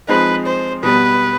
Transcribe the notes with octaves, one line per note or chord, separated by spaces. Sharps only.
F3 G#3 C4 D#4 B4
C5
B2 G3 B3 B4